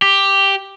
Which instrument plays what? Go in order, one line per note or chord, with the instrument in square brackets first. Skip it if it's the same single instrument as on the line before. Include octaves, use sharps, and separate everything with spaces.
[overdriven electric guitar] G4